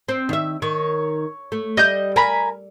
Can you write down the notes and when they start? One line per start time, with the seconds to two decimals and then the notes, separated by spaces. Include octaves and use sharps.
0.09 C4
0.29 D#3 E5
0.62 D#3 C#5
1.52 A3
1.77 G3 D#5 G6
2.16 A#4 G#5 A#5 B5